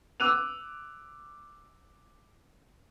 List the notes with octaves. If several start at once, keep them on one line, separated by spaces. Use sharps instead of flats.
D6 E6 F#6 D#7 F7